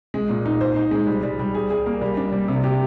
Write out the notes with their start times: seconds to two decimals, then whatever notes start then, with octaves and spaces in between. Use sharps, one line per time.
0.14 G#3
0.29 A#2
0.45 D#4
0.61 C5
0.76 D#4
0.91 G#3
1.07 G3
1.23 G3
1.39 G3
1.54 G#4
1.70 G#4
1.86 A#3
2.01 G3
2.17 D4
2.32 G3
2.48 C3
2.64 G4